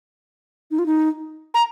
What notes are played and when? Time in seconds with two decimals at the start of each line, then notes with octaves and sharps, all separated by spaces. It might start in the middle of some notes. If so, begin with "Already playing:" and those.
0.71 D#4
0.79 F4
0.86 D#4
1.54 A#5